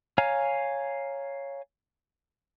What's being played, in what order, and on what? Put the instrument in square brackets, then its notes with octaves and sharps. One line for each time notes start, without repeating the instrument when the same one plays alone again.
[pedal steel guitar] C#5 F5 G#5 A#5 F6